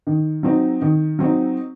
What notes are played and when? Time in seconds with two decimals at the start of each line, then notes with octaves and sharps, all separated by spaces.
0.07 D#3
0.43 F#3 C4 D#4
0.82 D#3
1.19 F#3 C4 D#4